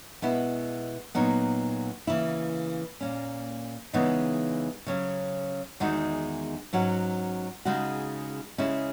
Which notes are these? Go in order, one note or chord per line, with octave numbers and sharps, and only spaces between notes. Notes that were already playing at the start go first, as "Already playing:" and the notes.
B2 G#3 B3 E4
A#2 F#3 B3 D#4
C#3 E3 A#3 E4
A#2 A#3 C#4
C#3 E3 G#3 B3 D#4
C#3 F#3 C#4
E2 D#3 G#3 D#4 F#4
G#2 F#3 C#4 F#4
C#3 G#3 D#4 F#4
C#3 G#3 C#4 E4